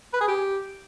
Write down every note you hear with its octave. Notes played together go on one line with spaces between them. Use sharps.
B4
G#4
G4